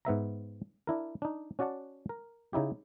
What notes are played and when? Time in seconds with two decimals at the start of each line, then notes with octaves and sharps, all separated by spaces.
0.05 G#2 B3 E5 A#5
0.87 D4 E4 A#4
1.22 D4 D#4
1.59 C#4 F#4 D5 F#5 A5
2.09 A#4
2.53 C#3 D#4 E4 G4